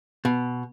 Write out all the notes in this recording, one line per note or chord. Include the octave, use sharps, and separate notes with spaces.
B2